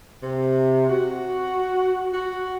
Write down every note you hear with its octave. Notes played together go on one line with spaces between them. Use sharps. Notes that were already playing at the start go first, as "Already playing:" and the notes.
C3
F#4
F#4